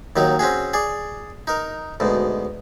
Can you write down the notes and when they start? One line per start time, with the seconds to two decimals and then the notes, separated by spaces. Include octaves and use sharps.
0.16 D#2 D#3 F#3 D#4
0.39 C4 C#4 F#4 G#4
0.73 G#4 D5
1.47 D#4 A#4
2.00 D2 G#2 B2